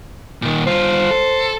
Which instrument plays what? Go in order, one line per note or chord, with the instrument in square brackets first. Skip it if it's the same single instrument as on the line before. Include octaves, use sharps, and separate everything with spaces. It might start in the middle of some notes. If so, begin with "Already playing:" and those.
[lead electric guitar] A#2 D#3
[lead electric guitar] G2 F4 [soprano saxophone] C5
[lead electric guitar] A4